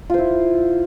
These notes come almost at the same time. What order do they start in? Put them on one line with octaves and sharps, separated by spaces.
F4 C5 E4